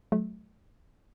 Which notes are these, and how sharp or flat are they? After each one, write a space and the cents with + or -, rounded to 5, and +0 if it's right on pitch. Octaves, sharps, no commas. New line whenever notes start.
F#3 +0 A3 -25